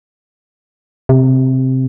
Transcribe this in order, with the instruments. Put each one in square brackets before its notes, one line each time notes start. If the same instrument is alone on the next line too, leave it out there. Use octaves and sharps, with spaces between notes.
[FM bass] C3